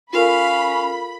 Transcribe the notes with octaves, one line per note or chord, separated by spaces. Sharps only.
C#4 F4 A4 A#4 F5 B5